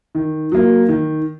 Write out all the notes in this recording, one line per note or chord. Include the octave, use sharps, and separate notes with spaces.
D#3
F#3 A#3
D#3